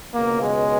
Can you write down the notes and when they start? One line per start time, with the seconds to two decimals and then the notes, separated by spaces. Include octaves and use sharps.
0.11 C#2 B2 A#3
0.41 G#3